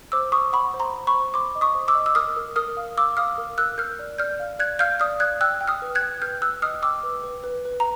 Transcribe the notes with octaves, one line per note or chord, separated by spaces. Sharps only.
C5 D6 E6
C5 C#6 D#6
F#5 B5 C#6
C5
A#5 C6
C5
B5 C#6
C5
C5 C6 D6
D#5
C#6 D#6
C5
D6 E6
D#5
E6
A#4 D#6 F6
A#4
A#4 D#6 F6
F5
F5 D6 E6
F5 D#6 F6
A#4
A#4 E6 F#6
A#4 F6 G6
D5
D5 F6 G6
F5
D5 F#6 G#6
F5 F6 G6
D5 D#6 F6
D5 F#6 G#6
G5 E6 F#6
G5
D#6 F6
B4
F#6 G#6
G5
B4 F6 G6
G5 E6 F#6
D#5 D#6 F6
G5 D6 E6
B4
B4
B4
B4
A#5